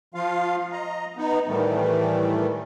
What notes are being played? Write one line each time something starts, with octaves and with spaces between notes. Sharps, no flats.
F3 F4 F5
D#5 A#5
B3 D#4
A2 D#3 E3 G3 A3